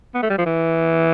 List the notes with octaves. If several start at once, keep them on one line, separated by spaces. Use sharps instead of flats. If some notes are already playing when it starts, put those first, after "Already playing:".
B3
A3
G3
F3
E3